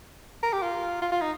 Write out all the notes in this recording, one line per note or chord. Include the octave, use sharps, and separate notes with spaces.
A#4
G4
F4
F4
F4
D#4